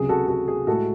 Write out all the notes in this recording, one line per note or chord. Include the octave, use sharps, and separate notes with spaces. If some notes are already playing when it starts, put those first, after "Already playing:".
Already playing: C#2 C3 F#3 G#4
F#4 A4
F#4 A4
G#4
A2 G#3 F#4 A4